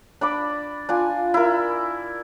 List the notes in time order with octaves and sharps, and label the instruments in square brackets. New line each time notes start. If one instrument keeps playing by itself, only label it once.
[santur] D4 B5 D6
D4 F4 G#5
E4 A#4